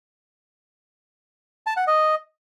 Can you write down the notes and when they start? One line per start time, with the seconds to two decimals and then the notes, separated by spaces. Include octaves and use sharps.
1.66 A5
1.77 F#5
1.87 D#5